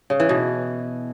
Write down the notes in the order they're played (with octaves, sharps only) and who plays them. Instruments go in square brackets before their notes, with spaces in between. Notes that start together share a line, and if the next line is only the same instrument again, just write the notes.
[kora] C#3
E3
B2